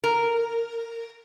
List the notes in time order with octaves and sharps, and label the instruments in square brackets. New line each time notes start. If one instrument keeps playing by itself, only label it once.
[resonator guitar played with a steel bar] A#4